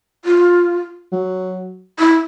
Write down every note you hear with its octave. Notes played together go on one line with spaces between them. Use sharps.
F4
F#3
E4